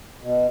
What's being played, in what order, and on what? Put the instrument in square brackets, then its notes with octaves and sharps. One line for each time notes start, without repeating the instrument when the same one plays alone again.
[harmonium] B2